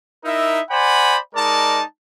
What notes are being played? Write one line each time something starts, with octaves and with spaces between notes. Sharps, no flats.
D#4 E4 A#4 E5
C5 D5 F#5 G#5 B5
G#3 D#4 A#4 D5 A5